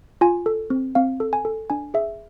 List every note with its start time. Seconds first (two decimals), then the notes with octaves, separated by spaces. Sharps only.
0.21 F4 G#5
0.46 A4
0.70 C4
0.95 C4 F5
1.20 A4
1.33 G#5
1.45 A4
1.70 D4 G#5
1.94 G#4 E5